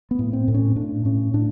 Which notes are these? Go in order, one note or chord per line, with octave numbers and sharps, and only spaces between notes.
B3
A2
C4
A2
C#4
A2 D4
A2 C#4
A2 D4